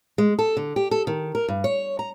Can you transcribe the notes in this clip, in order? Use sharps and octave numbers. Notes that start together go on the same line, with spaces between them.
G#3
A4
D3
G4
A4
D#3
A#4
G2
C#5
A#5